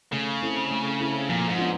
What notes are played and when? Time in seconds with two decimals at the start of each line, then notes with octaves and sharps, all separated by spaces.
0.12 C#3 A3
0.42 C4 E4 A4
0.71 A3
1.00 C4 E4 A4
1.29 A#2 F3
1.49 G#2
1.58 B3 D4 F4